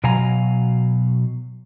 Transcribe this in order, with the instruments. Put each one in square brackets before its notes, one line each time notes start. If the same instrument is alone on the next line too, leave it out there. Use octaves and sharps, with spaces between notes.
[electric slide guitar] B2 F#3 F5 G#5 A#5